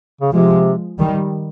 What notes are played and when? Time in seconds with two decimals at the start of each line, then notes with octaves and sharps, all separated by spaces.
0.21 C#3
0.32 C3 F3 G#3
0.99 D#3 G3